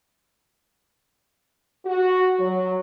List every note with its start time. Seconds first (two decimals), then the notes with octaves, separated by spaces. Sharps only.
1.86 F#4
2.39 F#3